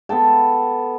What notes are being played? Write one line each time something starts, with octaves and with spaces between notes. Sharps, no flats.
B3 A4 G5 A5